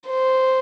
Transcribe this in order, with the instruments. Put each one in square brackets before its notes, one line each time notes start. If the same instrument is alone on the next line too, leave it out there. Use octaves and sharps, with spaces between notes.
[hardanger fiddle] C5